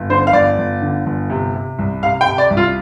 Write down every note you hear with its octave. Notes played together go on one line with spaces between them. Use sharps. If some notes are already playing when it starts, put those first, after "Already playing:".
Already playing: G1
D3 C5
F5
G1 D5
G1
D3
G1
C3
C3
C2
C3 F5
G5
C3
D5
C2
F4